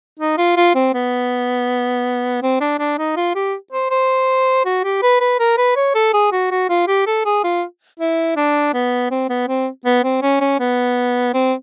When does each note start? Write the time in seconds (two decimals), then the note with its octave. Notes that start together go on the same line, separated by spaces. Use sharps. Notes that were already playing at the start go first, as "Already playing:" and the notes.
0.19 D#4
0.38 F4
0.57 F4
0.75 C4
0.94 B3
2.42 C4
2.61 D4
2.79 D4
2.98 D#4
3.16 F4
3.35 G4
3.72 C5
3.91 C5
4.65 F#4
4.84 G4
5.02 B4
5.21 B4
5.39 A#4
5.58 B4
5.76 C#5
5.95 A4
6.13 G#4
6.32 F#4
6.51 F#4
6.69 F4
6.88 G4
7.07 A4
7.25 G#4
7.44 F4
7.99 E4
8.36 D4
8.74 B3
9.11 C4
9.29 B3
9.48 C4
9.85 B3
10.04 C4
10.22 C#4
10.41 C#4
10.60 B3
11.34 C4